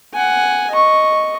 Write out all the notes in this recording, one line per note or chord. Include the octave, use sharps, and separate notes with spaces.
F#5 G#5
D#5 C#6